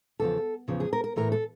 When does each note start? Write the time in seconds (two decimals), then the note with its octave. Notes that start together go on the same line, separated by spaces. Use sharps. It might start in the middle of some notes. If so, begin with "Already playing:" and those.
0.20 E2 C#3 F3 A4
0.68 E2 C#3 F3
0.80 G#4
0.93 A#4
1.04 A#4
1.16 A2 E3 A3 A#4
1.32 A4